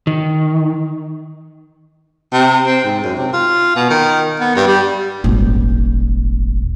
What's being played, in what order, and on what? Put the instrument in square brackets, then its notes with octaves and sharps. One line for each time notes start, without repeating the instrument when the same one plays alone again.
[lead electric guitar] D#3
[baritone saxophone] C3
C4
G#2
F#2
C3
F4
B2
D#3
B3
G2
G3
[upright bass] D#1 G#1